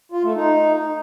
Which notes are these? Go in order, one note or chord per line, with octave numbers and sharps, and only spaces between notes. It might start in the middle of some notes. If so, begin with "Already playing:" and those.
F4
A3
D#4